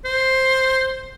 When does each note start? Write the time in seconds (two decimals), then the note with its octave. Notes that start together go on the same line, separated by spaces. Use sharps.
0.05 C5